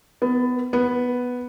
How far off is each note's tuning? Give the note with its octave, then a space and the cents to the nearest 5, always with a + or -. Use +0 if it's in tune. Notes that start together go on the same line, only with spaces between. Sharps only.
B3 +20
B3 +0